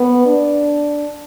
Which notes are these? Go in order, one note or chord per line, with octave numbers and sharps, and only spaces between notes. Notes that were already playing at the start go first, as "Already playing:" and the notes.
Already playing: B3
D4